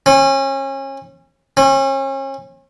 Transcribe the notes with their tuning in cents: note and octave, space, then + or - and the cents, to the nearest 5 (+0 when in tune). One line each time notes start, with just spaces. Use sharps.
C#4 -30
C#4 -35